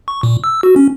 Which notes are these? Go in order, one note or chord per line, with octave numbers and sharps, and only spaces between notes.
C#6
A#2
E6
F#4
C#4